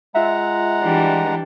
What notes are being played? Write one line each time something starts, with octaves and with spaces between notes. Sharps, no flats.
G#3 F4 E5 F#5 A#5
E3 G3 D4